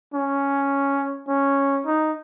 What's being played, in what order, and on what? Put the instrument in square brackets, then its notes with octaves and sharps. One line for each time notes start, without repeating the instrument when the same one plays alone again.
[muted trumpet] C#4
C#4
D#4